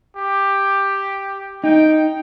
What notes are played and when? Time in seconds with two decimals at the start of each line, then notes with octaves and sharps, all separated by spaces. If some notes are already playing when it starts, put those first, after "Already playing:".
0.16 G4
1.64 D#4 G5